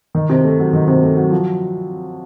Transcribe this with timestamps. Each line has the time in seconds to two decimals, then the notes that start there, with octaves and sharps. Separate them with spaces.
0.15 D#3
0.30 C3
0.45 A3
0.59 F#3
0.73 D#3
0.88 C3
1.02 A3
1.17 F#3
1.31 F3